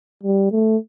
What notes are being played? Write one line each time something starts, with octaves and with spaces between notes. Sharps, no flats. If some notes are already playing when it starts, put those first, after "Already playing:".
G3
A3